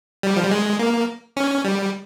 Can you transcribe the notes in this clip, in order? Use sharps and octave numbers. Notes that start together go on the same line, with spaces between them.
G3
F3
G3
G#3
A#3
C#4
G3